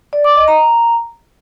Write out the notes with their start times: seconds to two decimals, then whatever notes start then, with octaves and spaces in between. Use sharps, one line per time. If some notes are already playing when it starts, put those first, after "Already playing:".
0.13 D5
0.24 D6
0.36 D#5
0.48 A#5